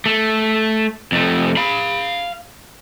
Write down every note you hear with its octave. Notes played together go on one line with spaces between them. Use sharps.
A3
F2 A3
F5 B5